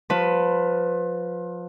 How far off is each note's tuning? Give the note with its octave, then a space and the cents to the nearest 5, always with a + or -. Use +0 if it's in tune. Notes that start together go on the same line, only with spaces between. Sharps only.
F3 +25 B4 +10